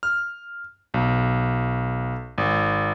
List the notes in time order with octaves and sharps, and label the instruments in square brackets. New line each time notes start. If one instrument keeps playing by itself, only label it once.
[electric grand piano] F6
B1
G#1